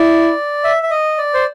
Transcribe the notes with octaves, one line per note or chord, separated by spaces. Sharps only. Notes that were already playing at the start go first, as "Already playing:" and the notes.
Already playing: E4 D5
E5
E5
D#5
D5
C5